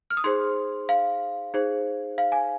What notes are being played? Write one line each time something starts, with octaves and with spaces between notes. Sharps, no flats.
F6
D#6
D#4 G#4 C5 C6
F5
D#4 G#4 C5
F5
G#5